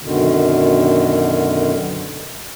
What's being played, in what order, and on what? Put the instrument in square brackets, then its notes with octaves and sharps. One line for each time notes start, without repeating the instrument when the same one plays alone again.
[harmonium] F#2 B2 D3 D#3